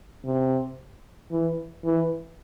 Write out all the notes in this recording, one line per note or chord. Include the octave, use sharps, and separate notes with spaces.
C3
E3
E3